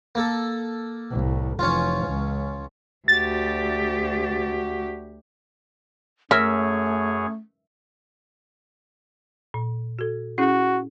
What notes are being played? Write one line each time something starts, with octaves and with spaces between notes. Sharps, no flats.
A#3 A4
C2 A2
F1 E3 C#4 F4
C#2
D2 F#4 G4 A6
F#2 A3 C#4 G#4 A#4 C#5 E5
A#2
F#4 A4
C#4 E4 F#4 G#4